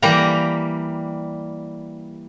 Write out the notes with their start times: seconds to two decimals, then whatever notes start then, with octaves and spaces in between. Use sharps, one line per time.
0.02 E3 G3 A#3 G4 A#5